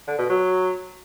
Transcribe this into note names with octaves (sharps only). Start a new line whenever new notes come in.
D3
B2
F#3